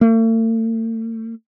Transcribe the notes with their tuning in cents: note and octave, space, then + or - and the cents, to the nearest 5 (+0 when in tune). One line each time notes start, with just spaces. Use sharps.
A3 +45